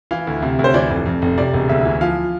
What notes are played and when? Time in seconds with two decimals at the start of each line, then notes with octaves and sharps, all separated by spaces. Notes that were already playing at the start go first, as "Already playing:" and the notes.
0.11 E3 F5
0.27 D2
0.42 C3
0.59 D2
0.64 C5
0.74 E3 D5
0.90 F1
1.06 F2
1.22 F1
1.38 C3 D5
1.54 E1
1.69 D2 E5
1.85 E3
2.01 F3 F5